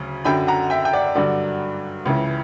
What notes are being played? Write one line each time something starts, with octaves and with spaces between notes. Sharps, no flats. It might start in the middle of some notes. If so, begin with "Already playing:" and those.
Already playing: D2 C#3 F#3
F#2 D3 F#3 G5 B5
F#5 A#5
E5 G5
G5
D5 F#5
G2 D3 F#3 D5 F#5
C#2 C#3 E3